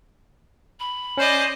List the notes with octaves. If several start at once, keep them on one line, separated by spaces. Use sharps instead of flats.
B5
C#4 C5 D5 D#5